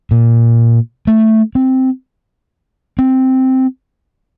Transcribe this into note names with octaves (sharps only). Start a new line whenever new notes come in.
A#2
A3
C4
C4